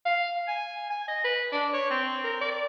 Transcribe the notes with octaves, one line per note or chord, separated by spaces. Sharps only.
F5
G#5
G#5
D#5
B4
D4
C#5
C4
A#4
D5